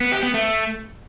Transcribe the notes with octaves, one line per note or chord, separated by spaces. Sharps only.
B3
G4
B3
A3